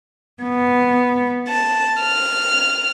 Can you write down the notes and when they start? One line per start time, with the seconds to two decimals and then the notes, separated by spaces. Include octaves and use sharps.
0.42 B3
1.48 A5
2.02 F6